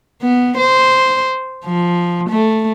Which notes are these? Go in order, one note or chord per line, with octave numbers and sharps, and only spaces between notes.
B3
C5
F3
A3